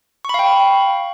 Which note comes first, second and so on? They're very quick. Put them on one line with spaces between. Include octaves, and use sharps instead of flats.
C#6 B5 F5 G5